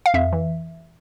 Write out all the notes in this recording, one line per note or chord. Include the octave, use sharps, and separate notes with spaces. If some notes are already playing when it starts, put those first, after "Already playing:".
F5
F2 E5
E3